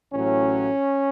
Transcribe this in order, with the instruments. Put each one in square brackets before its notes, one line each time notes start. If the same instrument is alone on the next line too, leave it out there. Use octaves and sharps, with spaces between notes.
[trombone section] A1 A2 F#3 C#4